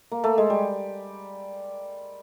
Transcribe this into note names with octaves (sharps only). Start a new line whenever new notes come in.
A#3
A3
G#3
G3